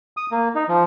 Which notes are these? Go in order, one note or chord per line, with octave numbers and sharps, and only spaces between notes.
D#6
A#3
D#4
F3